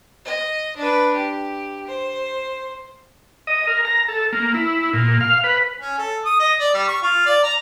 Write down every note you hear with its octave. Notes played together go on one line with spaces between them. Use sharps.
D#5
D4 B4
G4
C5
D#5
A#4
A#5
A4
A#3
E4
A#2
F5
B4
C#4
A4
D#6
D#5
D5
G3
C#6
F4
D5
A#5